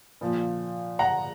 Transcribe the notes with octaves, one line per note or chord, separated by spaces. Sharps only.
A#2 F3
F#5 A#5